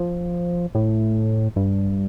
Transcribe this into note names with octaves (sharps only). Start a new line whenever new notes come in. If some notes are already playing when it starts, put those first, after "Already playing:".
Already playing: F3
A2
G2